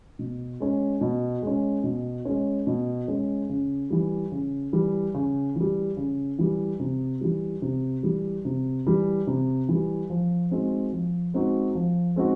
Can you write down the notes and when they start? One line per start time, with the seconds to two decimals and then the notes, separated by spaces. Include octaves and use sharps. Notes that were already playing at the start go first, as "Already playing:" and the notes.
0.19 B2
0.60 G#3 C#4
1.01 B2
1.42 G#3 C#4
1.84 B2
2.25 G#3 C#4
2.67 B2
3.08 G#3 C#4
3.49 C#3
3.90 E3 G3
4.32 C#3
4.73 E3 G3
5.14 C#3
5.56 E3 G3
5.97 C#3
6.39 E3 G3
6.80 C3
7.21 E3 G3
7.62 C3
8.03 E3 G3
8.45 C3
8.87 E3 G3
9.27 C3
9.69 E3 G3
10.10 F3
10.51 G#3 C4 D#4 F#4
10.93 F3
11.34 G#3 C4 D#4 F#4
11.75 F3
12.16 G#3 C4 D#4 F#4